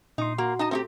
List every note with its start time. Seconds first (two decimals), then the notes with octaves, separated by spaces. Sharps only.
0.18 A#2 D#4 C6
0.38 A#3 F#4
0.59 D#4 D#5 A5
0.71 A3 C4 D#4 G4